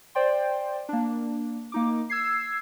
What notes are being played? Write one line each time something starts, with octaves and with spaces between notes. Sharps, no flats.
C5 D5 G5 C6
A#3 D4
A#3 D#4 D6
E6 G#6 C7